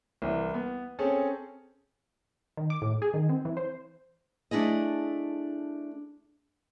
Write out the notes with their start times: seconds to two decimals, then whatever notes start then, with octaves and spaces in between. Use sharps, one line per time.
0.22 C2 E3
0.54 B3
0.99 C4 C#4 G#4 A4
2.57 D#3
2.70 D6
2.82 A2
3.02 G#4
3.14 D#3
3.29 C4
3.45 E3
3.57 C5
4.51 A3 D4 E4 G#4 D#5